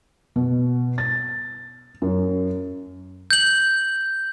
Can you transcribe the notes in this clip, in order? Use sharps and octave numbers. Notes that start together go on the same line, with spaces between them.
B2
A6
F#2
G6 F#7